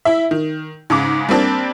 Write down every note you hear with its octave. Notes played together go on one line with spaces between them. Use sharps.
E4 E5
D#3
G#2 C#3 D6
G3 A#3 C4 D4